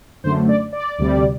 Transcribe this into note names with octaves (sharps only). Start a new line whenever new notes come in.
F#2 D3 A3 C5
D5
D5
D2 C3 G3